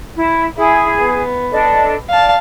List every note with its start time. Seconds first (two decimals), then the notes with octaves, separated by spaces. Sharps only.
0.16 E4
0.57 E4 G#4
1.00 B3
1.51 D4 A4 D#5
2.09 D5 F5 A5